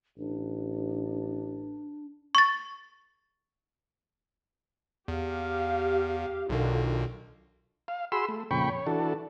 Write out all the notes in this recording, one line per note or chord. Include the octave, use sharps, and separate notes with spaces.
A1 D4
C#6 A6
E2 G4 F5
B1 B2 D3 D#3 F4
F5
F#4 G#4 B5 C6 E6
A3
F2 A#2 C#3 G5 B5 C#6
C#5
E3 D4 F#4 A4